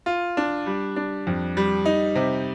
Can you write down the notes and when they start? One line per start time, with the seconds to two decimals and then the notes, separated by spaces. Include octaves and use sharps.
0.06 F4
0.37 D4
0.66 G3
0.96 D4
1.27 F2
1.57 G3
1.85 D#4
2.15 C3